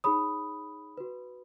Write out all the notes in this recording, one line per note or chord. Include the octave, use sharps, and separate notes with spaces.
D#4 G#4 C#5 B5 D#6
F#4 B4